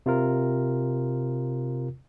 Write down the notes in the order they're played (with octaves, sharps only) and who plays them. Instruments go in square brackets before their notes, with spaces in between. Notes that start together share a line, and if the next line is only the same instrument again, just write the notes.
[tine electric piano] C3 F4 A#4